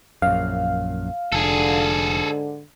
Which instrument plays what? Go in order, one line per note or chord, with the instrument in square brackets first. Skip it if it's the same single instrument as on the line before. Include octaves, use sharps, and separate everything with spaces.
[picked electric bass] A#1 F#2 [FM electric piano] F5
[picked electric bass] F1 [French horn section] G#2 D3 [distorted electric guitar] G#4 A4